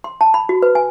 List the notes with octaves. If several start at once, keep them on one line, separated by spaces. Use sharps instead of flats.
C6
A5
B5
F#4
B4
G#5